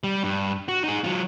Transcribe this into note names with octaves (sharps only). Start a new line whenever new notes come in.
G3
G2
F#4
D#4 G#4
F#3 F4